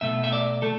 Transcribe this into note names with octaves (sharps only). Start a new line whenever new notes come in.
B2 A3 E5
E5
D5
A3 A4